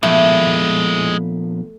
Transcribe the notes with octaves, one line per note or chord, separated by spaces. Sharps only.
A#2 F3 G#3 A3 B3 E4